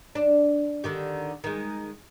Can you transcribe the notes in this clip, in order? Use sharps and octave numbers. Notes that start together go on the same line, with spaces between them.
D4
D3 D#3 G4
D#3 G#3